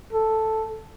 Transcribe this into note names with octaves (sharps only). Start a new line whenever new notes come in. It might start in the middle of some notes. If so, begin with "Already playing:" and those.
A4